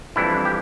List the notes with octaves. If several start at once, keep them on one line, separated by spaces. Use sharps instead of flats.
F2 E3 G3 D4 E4
G4